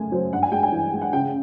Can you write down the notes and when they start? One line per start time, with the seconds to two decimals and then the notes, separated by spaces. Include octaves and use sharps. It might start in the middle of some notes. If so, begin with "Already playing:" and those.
Already playing: F#2 C#3 A3 G#5
0.12 F#3 C5
0.32 G2 F#5
0.43 G#5
0.52 G#3 G5
0.63 G#5
0.72 E3
0.93 G#3
1.02 F#5
1.13 C#3 G5